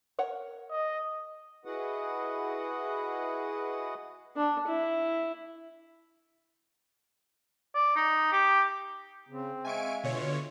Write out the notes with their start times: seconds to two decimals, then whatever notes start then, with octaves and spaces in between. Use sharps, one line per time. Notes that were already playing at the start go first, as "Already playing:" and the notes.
0.19 A#4 C#5 F#5
0.71 D#5
1.65 E4 F#4 G#4 B4 D#5 F#5
4.36 D4
4.67 E4
7.74 D5
7.96 D#4
8.32 G4
9.28 C#3 C4
9.65 G#3 E5 F5 G#5 C#6 D7
10.04 B2 D3 F4 C#5